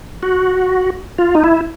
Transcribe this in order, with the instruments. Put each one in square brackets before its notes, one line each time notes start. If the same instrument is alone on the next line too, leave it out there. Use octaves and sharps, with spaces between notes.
[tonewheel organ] F#4
F4
D#4
E4